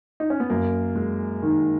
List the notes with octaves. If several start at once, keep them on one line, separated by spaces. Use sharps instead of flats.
D#4
C#4
B3
F#2 A#3
G#3
D#3